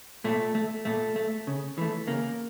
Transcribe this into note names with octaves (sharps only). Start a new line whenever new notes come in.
A#2 A3
A3
A#2 A3
A3
C#3
E3 A3
C#3 A#3